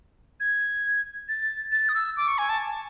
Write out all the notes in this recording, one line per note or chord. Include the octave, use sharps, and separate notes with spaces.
G#6
A6
A6
D#6
E6
D6
C#6
G#5
A5